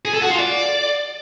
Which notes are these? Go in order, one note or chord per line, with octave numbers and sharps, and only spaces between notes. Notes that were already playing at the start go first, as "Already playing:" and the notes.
G#4
A4
F#4
F4
D5